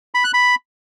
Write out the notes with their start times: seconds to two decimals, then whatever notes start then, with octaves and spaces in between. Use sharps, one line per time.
0.15 B5
0.24 F#6
0.34 B5